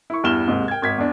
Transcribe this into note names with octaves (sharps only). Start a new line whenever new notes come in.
E4 C#6
E2 G2 E4 F6 E7 G7
D#2 G#2 C3
G5 G#6
G#1 G#6 B6
E2 D4